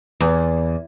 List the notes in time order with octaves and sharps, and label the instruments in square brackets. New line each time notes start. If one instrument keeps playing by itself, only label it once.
[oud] E2